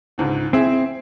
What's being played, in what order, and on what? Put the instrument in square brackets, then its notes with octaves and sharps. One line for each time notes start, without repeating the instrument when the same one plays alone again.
[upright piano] C#2 G#2 D3
[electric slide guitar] C4 [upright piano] E4 G#4 E5